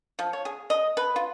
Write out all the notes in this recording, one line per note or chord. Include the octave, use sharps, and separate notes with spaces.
F3
C#5
G#4
D#5
B4
F4